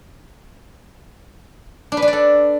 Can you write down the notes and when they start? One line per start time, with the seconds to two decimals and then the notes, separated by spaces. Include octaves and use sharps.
1.92 D4
1.97 B4
2.02 D4
2.08 D5
2.13 A4